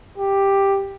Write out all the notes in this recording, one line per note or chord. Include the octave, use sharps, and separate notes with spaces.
G4